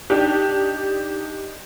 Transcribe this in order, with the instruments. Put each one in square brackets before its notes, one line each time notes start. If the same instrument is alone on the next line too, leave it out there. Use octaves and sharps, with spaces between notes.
[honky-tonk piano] D4 D#4 G4